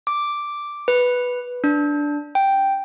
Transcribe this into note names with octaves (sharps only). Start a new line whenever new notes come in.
D6
B4
D4
G5